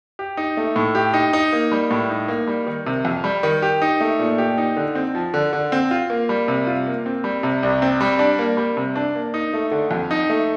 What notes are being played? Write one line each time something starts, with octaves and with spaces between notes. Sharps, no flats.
G4
D#4
A3
A2
G4
D#4
D#4
A#3
G3
A2
D#4
A#3
G3
D#3
C3
F2
G3
D#3
G4
D#4
A3
A#2
G4
D#4
D3
C4
F3
D3
D3
C4
F4
A#3
G3
C3
F4
A#3
C4
G3
C3
C2
C4
G3
D4
A#3
G3
C3
D4
A#3
D#4
A3
D3
F2
D#4
A3